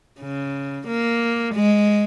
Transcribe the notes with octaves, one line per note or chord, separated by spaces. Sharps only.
C#3
A#3
G#3